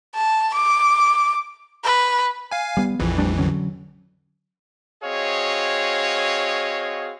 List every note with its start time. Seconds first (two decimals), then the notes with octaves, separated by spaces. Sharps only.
0.15 A5
0.54 D6
1.84 B4
2.51 F5 G#5
2.77 G3 B3
3.00 A#1 F2 E3 F3
3.18 G3 A3 D4
3.38 D3 F#3 C#4
5.03 C4 F#4 G#4 C#5 D#5 F5